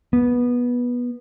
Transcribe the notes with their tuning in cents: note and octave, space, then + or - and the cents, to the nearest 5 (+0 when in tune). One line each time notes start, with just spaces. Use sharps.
B3 -15